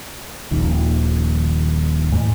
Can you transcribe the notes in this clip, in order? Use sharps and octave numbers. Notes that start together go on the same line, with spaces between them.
D#1 A#1 D#2
E2 A2